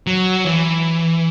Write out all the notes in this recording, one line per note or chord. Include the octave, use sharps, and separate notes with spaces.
F#3
E3